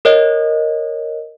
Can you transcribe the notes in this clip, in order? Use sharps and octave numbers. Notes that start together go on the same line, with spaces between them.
A#4 C#5 D#5